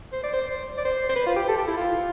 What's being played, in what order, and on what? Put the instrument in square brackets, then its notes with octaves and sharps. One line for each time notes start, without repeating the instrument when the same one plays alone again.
[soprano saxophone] C5
D5
C5
D5
C5
C5
B4
F4
G4
A4
G4
E4
F4